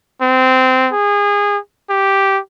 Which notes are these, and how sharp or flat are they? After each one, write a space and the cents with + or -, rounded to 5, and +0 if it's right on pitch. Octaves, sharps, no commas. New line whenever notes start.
C4 -20
G#4 -25
G4 -5